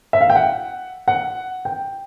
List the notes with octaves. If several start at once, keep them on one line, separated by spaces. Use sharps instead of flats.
E5
F5
G5
F#5
F#5
G5